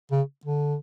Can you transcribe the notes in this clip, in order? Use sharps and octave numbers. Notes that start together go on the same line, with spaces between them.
C#3
D3